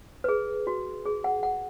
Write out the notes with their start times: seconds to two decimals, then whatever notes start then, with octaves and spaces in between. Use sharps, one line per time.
0.24 B4
0.28 G#4
0.67 F#4
1.05 G#4
1.24 F#5
1.43 F#5